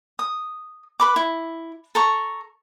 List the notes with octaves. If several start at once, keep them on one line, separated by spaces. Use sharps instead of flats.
D#6
B4 B5 D6
E4
A4 A#5 C#6